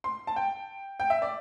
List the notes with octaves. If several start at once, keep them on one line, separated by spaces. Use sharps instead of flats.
C6
A5
G5
G5
E5
D5